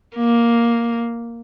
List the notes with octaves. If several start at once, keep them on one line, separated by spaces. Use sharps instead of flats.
A#3